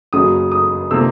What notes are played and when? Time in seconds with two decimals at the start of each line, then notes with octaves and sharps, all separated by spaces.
0.13 F#1 F#2 C#3 F#3 D#6
0.52 D#6
0.91 C3 F3 A#3 D4 E6